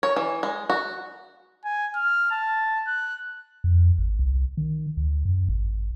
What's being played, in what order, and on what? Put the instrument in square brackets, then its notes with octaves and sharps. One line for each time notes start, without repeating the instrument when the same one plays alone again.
[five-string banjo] C#5
E3
G#3
F#4
[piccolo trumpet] G#5
F6
A5
F#6
[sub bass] F2
G#1
C2
D#3
D2
F#2
G#1